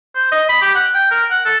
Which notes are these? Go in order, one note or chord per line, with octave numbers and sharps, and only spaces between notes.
C5
D#5
B5
G4
F#5
G5
A#4
F#5
A4